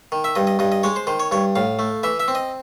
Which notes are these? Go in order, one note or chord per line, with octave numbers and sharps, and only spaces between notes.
D#3
E5
G2 D#5
D#5
G2 D#5
D#5
G#3 C#5
C5
D#3 C5
C#5
G2 C#5
A2 F5
A3
E3 E5
E5
C4
D#5